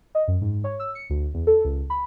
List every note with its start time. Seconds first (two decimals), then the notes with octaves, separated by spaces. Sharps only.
0.15 D#5
0.28 F#2
0.41 G#2
0.64 C#5
0.80 E6
0.95 C#7
1.10 D2
1.34 E2
1.47 A4
1.64 C#2
1.90 B5